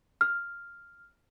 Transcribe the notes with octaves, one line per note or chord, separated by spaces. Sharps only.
F6